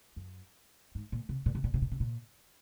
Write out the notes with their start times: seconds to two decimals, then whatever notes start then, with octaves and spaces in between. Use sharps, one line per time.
0.16 F#2
0.95 G#2
1.12 A#2
1.29 C3
1.46 A#2
1.55 C3
1.64 A#2
1.74 C3
1.82 A#2
1.91 C3
2.00 A#2